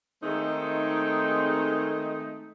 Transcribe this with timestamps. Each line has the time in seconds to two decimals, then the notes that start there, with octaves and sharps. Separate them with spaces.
0.22 D#3 G#3 A3 C4 D#4